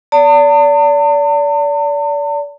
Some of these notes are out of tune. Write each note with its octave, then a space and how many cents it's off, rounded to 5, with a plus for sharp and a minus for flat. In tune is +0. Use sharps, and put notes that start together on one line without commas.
D5 -30 A5 +45